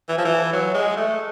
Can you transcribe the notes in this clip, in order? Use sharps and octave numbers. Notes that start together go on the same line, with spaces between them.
E3
F3
E3
F#3
G#3
A3